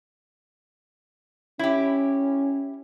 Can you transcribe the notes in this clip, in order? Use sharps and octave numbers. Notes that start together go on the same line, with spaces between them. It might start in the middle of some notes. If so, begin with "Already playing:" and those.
C#4 E4 G4